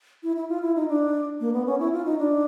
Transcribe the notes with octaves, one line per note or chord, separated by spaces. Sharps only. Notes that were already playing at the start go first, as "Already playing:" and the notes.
E4
E4
F4
E4
D#4
D4
A#3
B3
C#4
E4
F4
D#4
D4